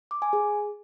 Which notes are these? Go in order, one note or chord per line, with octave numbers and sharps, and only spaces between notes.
D6
G#5
G#4